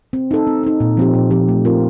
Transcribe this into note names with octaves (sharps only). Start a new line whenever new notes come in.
C4
D#4 A4
C4
D#4 A4
A#2
F3 C4 G4
A#2
F3 C4 G4
A3
C4 F4 A#4